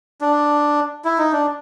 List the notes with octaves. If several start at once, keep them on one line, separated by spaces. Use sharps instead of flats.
D4
E4
D#4
D4